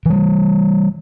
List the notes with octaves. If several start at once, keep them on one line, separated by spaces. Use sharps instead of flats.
E3 G3